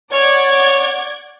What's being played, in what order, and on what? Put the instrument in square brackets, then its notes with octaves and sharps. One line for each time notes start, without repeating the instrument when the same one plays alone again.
[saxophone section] C#5 [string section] D5 F#5 G#6